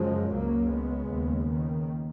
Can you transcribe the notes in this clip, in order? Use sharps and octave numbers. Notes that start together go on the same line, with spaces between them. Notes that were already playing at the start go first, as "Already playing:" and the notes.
Already playing: F#2 C#3 F3 G#3
C#2 C#3 F#3 A#3
G#3 B3
D#2 C#3
D#3